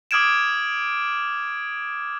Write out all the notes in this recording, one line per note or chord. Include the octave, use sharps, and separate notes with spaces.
D6 D#6 F6 G#6 D7 E7